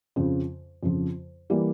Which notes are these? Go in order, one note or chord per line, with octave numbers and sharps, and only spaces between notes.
F2 C#3 F3
F2 C#3 F3
E3 G3 A#3